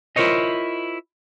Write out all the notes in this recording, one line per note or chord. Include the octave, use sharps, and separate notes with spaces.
E4 F4 A#4 C5 C#5 D#5